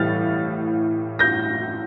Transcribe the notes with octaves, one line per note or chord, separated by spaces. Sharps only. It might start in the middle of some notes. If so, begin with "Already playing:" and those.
Already playing: A2 E3 G3 F6 A6
G6 A#6